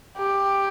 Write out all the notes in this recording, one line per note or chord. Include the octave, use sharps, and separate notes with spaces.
G4